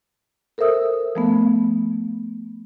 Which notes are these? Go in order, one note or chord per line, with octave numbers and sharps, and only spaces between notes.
A4 A#4 C5 E5 D#6 E6
F3 A3 B3